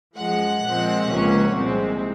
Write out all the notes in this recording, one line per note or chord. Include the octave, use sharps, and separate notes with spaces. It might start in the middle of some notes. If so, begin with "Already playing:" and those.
F#2 F3 G#3 F#5
A#2 F3 G#3 C4
C#2 C3 F3 A#3 C#4
C2 A#2 G#3 C4